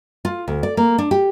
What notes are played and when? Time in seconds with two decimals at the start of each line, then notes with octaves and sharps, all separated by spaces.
0.25 F4
0.48 D2
0.63 D5
0.77 A#3
0.98 D4
1.11 G4